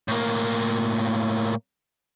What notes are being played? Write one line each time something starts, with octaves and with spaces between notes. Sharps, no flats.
A2 A#3